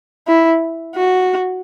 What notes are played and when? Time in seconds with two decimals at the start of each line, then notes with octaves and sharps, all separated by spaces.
0.28 E4
0.95 F#4